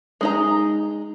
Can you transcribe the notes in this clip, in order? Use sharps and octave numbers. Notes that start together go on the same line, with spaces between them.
G#3 D#4 A#5